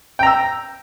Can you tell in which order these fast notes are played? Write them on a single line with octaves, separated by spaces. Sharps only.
G5 A#5 E6